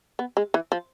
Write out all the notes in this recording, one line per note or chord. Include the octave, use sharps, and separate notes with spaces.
B3
G#3
E3
F3